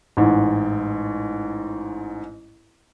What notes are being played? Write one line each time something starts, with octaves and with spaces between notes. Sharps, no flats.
A1 G#2